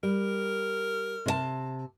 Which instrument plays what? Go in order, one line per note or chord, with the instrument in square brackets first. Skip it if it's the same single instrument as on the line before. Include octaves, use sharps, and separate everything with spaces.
[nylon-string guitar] G3 [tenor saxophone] A#4
[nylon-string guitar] C3 C#5 A5